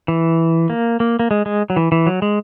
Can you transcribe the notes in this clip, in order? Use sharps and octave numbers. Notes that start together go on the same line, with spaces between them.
E3
A#3
A#3
A#3
G#3
G#3
F#3
E3
E3
F#3
G#3